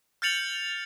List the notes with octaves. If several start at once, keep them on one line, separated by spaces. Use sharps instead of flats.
F6 G6 A6 C#7 F7 F#7